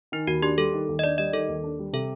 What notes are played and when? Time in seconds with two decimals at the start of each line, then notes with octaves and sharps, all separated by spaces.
0.12 D#3 D#4
0.27 D#2 F#4
0.42 D4 G4
0.58 G3 A4
0.73 D#3
0.88 D#2
0.99 D#5
1.04 D4 D5
1.18 G3 D#5
1.33 D#3 A4
1.48 D#2
1.64 D4
1.79 G3
1.93 C3 A4